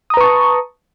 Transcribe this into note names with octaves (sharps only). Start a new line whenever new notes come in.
B4 A5 A#5 C#6 D#6